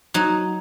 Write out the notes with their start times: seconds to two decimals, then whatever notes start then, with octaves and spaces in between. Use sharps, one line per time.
0.14 F#3 D#4